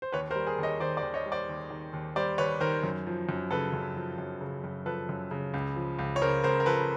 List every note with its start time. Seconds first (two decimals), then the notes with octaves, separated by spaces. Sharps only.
0.02 C5
0.12 D#2 B4 C#5
0.31 A#4 C5
0.35 G3
0.47 G#4 A#4
0.58 D#2
0.63 C#5 D#5
0.80 D#3 C5 D5
0.97 C5 D5
1.03 D#2
1.14 C#5 D#5
1.25 G3
1.32 C5 D5
1.49 D#2
1.70 D#3
1.93 D#2
2.16 G3 C5 D5
2.38 D#2 B4 C#5
2.60 D#3 A#4 C5
2.84 F#2
3.07 F3
3.29 F#2
3.51 C#3 A4 B4
3.73 F#2
3.96 F3
4.18 F#2
4.41 C#3
4.64 F#2
4.86 F3 A4 B4
5.09 F#2
5.31 C#3
5.54 C#2
5.76 F3
5.99 C#2
6.16 C#5
6.22 C#3 A#4 C5
6.44 C#2 A#4 C5
6.60 A#4
6.66 F3 A4 B4